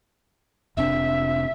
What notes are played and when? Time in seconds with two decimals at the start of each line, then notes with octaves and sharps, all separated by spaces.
0.77 F1 C3 D4 E5